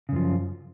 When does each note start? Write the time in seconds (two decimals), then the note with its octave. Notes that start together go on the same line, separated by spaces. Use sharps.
0.09 C#3
0.12 F#2
0.16 F3